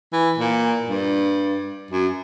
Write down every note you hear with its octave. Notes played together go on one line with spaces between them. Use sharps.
E3
A#2
G2
F#2